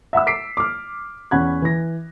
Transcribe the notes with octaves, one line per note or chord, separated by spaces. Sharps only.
E5 F#5 B5 E6
D6 B6 C7 D7
D6 F6
E2 C#4 F#5 B5 F#6 G#6
E3 A#6